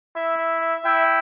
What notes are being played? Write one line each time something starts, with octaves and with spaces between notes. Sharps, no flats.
E4 E5
E5
E5
E4 G5